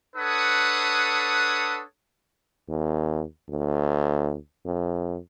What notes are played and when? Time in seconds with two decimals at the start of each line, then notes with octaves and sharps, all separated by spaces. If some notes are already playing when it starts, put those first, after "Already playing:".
0.16 D4 A4 B4 C#5 F#5 D#6
2.69 D#2
3.49 D2
4.66 F2